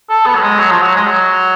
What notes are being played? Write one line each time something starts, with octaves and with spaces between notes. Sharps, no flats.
A4
B3
F#3
G#3
F#3
F3
F#3
G#3
F#3